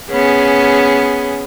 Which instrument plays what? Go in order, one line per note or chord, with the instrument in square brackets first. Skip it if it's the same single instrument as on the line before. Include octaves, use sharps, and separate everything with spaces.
[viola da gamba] B3 C#4 G#4